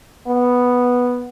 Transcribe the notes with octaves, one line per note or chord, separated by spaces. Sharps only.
B3